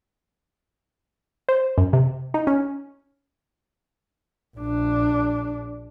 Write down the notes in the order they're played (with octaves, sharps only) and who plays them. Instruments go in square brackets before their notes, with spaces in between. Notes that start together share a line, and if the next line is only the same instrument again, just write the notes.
[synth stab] C5
F#2
C3
D#4
C#4
[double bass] A#1 D4